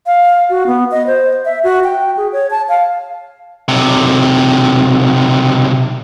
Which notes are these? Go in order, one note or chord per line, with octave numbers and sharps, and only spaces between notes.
F5
F#4
B3
D#5
C5
E5
F#4
G5
G#4
C#5
A5
F5
B1 C3